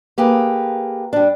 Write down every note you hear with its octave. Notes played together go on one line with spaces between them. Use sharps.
A#3 G4 G#4 B4
G3 D4